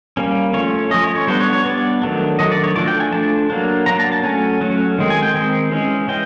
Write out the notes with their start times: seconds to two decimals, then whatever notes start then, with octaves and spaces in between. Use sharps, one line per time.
0.17 G3 A#3 C#4
0.53 F3 A3 C#4 C#5
0.91 F3 A3 C#4 D#5
1.04 C#5
1.15 C#5
1.27 G3 B3 D4 C5
1.40 C#5
1.53 C#5
1.65 G3 B3 D4 D5
2.02 D#3 F#3 A3 D4
2.39 D#3 F#3 A3 D4 D#5
2.52 D5
2.64 C#5
2.76 F3 A3 D4 D5
2.88 G5
3.00 G#5
3.13 F3 A3 D4 A5
3.50 F#3 A#3 D4
3.86 F#3 A#3 D4 A#5
3.99 A5
4.12 A5
4.23 F#3 A3 C#4 G#5
4.61 F#3 A3 C#4
4.98 D#3 G#3 C4
5.10 G#5
5.23 G5
5.34 D#3 G#3 C4
5.71 E3 G#3 C#4
6.08 E3 G#3 G5